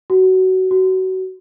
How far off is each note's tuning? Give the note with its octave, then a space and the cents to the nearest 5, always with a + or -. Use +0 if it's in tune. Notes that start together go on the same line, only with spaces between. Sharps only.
F#4 +20
F#4 +25